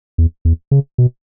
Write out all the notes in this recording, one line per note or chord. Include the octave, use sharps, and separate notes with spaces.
E2
E2
C#3
B2